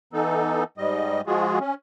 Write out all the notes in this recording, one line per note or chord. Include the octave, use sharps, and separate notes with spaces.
E3 B3 D#4 A4
G#2 G3 D#5
F3 G#3 F4 F#4 G#4
C#4